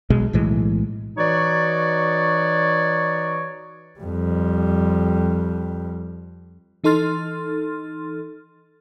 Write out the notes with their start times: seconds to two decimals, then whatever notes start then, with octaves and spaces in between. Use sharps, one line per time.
0.10 B1 B2 G#3
0.33 B1 A2 E3 G#3
1.17 E3 D#4 F#4 C#5 D5
4.00 F2 G3
6.84 E3 D#4 A4 C6 F6 A6